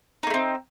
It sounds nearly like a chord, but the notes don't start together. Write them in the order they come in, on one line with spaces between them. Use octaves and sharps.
D#4 A#3 A3 C4